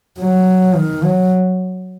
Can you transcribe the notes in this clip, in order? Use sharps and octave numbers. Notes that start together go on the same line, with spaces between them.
F#3
D#3
F#3